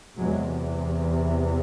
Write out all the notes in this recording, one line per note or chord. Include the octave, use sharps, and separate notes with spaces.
E2 C3 F#3 G#3